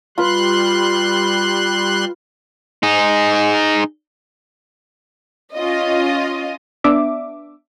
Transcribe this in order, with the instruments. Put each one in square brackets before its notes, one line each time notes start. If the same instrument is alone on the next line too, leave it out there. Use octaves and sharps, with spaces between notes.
[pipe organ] G3 C6 F#6 [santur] F4 B4
[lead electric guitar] D#4 G#4
[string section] C#4 F4 D#5
[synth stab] B3 D4 E5 D6